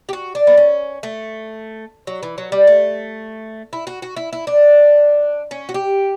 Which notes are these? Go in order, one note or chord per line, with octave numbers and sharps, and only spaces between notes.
G4
F#4
D4
B3
C#4
A3
F#3
E3
F#3
G3
A3
E4
F#4
F#4
E4
E4
D4
C#4
F#4
G4